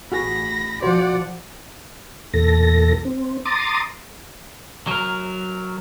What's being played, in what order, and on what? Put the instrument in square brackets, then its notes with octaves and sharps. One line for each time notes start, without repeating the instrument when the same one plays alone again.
[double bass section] A1 [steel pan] F#4 G#4 [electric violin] B5 A#6
[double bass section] A#1 F3 [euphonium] F#4 [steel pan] C5 [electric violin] D5 F#5
[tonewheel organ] E2 A#2 A4 A#6
C4
A#5 C6 D6 D#6 A6
[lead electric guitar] F#3 A#4